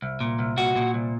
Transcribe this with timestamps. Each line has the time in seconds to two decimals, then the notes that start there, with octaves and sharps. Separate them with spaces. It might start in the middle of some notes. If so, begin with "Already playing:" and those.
0.02 C2
0.21 A#2
0.39 C2
0.57 A#2 F#4
0.76 A#2
0.94 C2